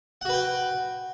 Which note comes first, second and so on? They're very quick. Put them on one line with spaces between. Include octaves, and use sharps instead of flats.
F#5 F#4 B4 G5